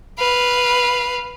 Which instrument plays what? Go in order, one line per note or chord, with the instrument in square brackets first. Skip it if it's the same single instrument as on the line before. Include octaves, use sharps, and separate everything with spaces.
[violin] B4 F5